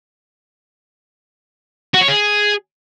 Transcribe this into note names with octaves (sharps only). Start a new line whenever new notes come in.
F#4
C#5
G#4